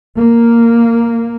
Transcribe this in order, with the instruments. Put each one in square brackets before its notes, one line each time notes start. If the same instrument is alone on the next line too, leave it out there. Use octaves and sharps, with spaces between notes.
[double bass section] A#3